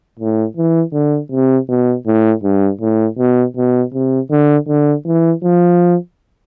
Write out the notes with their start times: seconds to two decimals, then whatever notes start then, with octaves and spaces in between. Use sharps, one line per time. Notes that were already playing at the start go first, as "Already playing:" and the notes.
0.19 A2
0.57 E3
0.93 D3
1.32 C3
1.69 B2
2.07 A2
2.44 G2
2.81 A2
3.18 B2
3.57 B2
3.94 C3
4.31 D3
4.68 D3
5.07 E3
5.44 F3